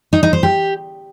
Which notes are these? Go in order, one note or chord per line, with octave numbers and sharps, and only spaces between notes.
D#4
D#4
C5
G4